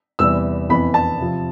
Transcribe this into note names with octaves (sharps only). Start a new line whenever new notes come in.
E2 C3 E3 G3 C4 E6
F2 E3 B3 B5
A5
C3 F3 C4